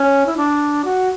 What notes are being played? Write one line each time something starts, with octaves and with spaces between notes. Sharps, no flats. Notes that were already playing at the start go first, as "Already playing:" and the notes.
Already playing: C#4
E4
D4
F#4